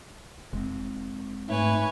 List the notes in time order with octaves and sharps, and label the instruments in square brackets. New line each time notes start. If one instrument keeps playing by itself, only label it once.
[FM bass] F1 [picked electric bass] G#3 C4
[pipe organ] G#2 A3 [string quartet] B4 C#5 G#5